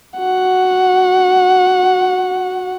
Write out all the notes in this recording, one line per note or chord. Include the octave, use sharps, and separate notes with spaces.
F#4 F#5